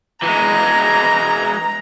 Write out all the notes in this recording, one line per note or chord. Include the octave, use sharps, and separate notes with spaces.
E3 G#3 A#5